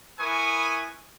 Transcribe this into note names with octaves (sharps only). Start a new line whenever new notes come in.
E4 A#4 B4 G#5 C#6 D#6